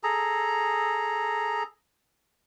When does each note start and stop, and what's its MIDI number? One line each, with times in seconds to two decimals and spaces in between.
0.03 1.63 68
0.03 1.63 69
0.03 1.63 82